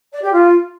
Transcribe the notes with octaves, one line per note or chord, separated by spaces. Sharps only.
D5
G4
F4